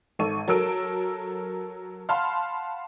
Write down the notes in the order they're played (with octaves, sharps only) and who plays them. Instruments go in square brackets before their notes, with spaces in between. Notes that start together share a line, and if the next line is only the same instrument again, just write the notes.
[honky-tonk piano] G#1 A4 C#6 D#7
F#3 A4 A#4 E6 D7
F5 F#5 A5 B5 C6 F6